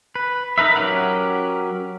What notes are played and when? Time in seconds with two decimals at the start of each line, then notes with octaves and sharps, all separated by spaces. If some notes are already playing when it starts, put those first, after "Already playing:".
0.15 B4
0.58 D#4 A#4 B4 E5
0.76 F#3 C#4 G4 A#4 F#5